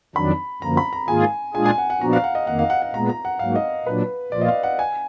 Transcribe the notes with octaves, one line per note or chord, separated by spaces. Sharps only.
F2 D#3 F#3 D4 B5
F#2 D3 F3 A#3 A#5
B5
A#5
G#2 D#3 A#3 F4 G#4 G#5
A#2 G#3 D4 F4 G#4 G#5
G#5
F#5
F#5
A#2 F3 B3 D4 F#4 A#5
F5
F#5
D#5
F2 D#3 A#3 F#5
F5
F#5
F#5
A#2 G#3 B3 A#5
A#5
F#5
G#2 F#3 A#3 F5
D#5
A#2 F#3 D4 B4
A#2 F3 A#3 F4 D5
D#5
F5
F#5
G#5